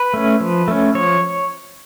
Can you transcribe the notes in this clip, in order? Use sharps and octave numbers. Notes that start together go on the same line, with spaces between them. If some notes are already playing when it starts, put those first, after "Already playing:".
Already playing: B4
A3 C#4
F3
A3 C#4
F3 C#5